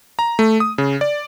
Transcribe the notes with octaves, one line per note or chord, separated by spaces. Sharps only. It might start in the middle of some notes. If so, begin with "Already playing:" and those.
A#5
A3
D#6
C#3
D5